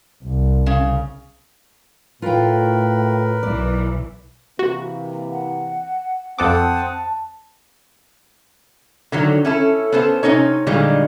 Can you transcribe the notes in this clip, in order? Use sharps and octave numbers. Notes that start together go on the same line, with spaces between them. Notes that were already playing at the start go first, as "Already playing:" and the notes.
C2
C#3
A2 F4 A#4 B4 G5
B1 E3 D5
C3 E3 A#3 F#4
F#5
F2 C4 A4 F#5 A5 D6 D#6
D3 D#3 F#3
C#4 E4 A4
B3 C#4 A4 C5
C3 E3 C#4 D#4 C#5
A#2 D3 D#3 G3 G#3